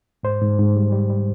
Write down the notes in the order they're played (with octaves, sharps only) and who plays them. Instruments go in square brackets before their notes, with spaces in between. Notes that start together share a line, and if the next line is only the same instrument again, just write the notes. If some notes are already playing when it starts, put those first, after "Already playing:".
[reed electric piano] G#2 C5
G#2
G#2
G3
G3
G3